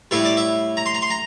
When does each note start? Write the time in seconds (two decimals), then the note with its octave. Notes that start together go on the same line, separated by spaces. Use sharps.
0.11 A2 G3 E5
0.25 D5
0.37 E5
0.77 A#5
0.86 C6
0.95 A#5
1.02 C6
1.10 A#5